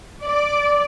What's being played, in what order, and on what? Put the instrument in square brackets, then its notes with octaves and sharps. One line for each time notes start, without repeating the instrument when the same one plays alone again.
[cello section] D5